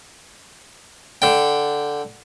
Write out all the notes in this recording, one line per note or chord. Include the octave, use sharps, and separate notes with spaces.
D3 G5